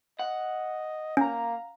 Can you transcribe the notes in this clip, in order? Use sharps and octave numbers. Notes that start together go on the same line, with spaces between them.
D#5 F#5
A#3 C#4 F5 A#5